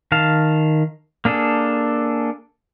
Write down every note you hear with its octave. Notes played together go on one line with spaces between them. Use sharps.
D#3 F5 A5
A#3 D4 G#4 A4